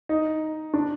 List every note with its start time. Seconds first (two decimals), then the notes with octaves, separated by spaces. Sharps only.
0.09 D#4
0.74 D4